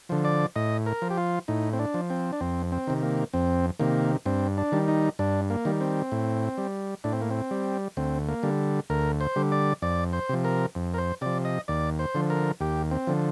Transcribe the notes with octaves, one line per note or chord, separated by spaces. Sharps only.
D3 F3
D5
A2 D#5
A#4
F3
G4
F4
A2 D#4
C4
D4
F3
C4
D4
F2 C4
C4
C3 D#3
A#3
F2 C4
C3 D#3 A#3
G2 C4
D4
D#3 G3
D#4
G2 D4
A#3
D#3 G3
C4
A2
G3
A2 D4
C4
A#3
C4
G3
D2 C4
A#3
D3 G3
D2 A#4
C5
D3 G3
D5
F2 D5
C5
C3 F3
A#4
F2
A#4
C5
C3 F3 D5
D#5
D#2 D5
C5
D3 F3
A#4
D#2 G4
C4
D3 F3